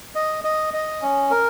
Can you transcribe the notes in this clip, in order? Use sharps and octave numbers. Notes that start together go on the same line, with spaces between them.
D#5
D#5
D#5
C#4
A#4